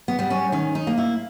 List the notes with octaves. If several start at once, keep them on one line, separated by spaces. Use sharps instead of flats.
B3
G3 B3
C#4
D#3 C#4
D#4
A#3
E4